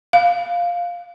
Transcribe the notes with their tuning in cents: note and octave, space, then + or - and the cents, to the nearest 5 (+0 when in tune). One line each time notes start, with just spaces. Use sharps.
F5 +0